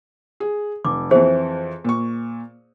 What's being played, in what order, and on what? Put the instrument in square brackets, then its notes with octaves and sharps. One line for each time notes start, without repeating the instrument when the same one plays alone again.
[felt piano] G#4
[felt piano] F1 [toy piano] D6
[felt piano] F2 E3 [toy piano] G#4 C5
[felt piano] A#2 C#6